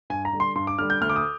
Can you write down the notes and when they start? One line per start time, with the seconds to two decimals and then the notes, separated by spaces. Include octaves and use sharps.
0.10 G2 G#5
0.25 A#5
0.33 D3 G3
0.40 C6
0.55 G2 C6
0.67 D6
0.78 D3 G3 F6
0.90 G6
1.01 D2 F6
1.10 D6
1.16 D#6